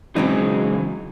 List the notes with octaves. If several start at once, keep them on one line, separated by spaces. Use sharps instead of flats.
C#3 E3 F#3 G#3 C4 D#4